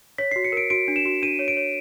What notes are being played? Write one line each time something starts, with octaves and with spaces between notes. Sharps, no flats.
C#5 B6
C7
F#4
C#7
A#4 D7
F#4 D7
D4
E7
F#4
D4 D#7
C#5
D7
C#5